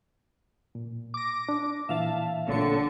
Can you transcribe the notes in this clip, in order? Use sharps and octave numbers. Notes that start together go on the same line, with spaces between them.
A#2
D6 A#6
D4
A#2 E3 E5 F5 A5
A1 A#2 D3 C#5 A5 C#7